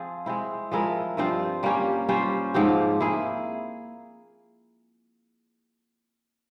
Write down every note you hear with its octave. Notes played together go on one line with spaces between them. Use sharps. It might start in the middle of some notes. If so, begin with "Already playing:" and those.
Already playing: F3 C4 F4 G#4
G#3 C4 E4
F3 G#3 E4 A#4
G2 F3 C4 F4
G3 A#3 C#4 G4
G3 C#4 F4 C5
G#2 F3 C4 G4
A#3 E4 G#4